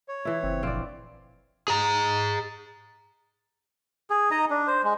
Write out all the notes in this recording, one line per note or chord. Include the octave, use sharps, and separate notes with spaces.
C#5
E3 E4
F#1 C4
A#1 C4 D5 F5
G#4 A#5
G#4
D#4 D#5 A#5
D4
C5
G#3